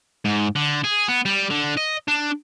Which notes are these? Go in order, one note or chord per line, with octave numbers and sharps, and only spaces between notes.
G#2
D3
G#4
B3
G3
D3
D#5
D4